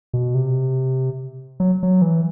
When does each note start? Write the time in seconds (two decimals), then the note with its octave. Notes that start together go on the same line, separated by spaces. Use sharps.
0.14 B2
0.35 C3
1.60 F#3
1.83 F#3
2.02 E3